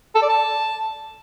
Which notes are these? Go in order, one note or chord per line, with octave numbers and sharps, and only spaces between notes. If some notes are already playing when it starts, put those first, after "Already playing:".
A4
D5
A5